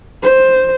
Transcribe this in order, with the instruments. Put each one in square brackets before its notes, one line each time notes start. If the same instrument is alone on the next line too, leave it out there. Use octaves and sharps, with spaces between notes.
[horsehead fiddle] C5